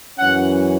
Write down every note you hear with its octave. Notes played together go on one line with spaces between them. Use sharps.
F#2 E3 C#4 F#5